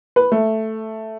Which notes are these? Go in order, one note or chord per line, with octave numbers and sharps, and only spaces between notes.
B4
A3